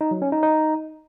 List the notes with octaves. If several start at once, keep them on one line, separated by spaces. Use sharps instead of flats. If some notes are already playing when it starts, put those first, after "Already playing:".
D#4
F#3
C#4
D#4
D#4